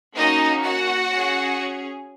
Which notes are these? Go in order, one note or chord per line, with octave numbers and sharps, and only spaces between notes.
A#3 C#4 D#4 F#4 D#5
F#4 F#5
C#4 G#4